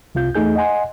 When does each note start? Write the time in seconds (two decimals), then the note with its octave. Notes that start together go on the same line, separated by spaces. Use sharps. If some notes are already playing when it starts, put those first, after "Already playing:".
0.15 C2 C3 F4 G6
0.35 E2 A3 D#4 G#4 G6
0.56 D#5 F#5 G#5 C6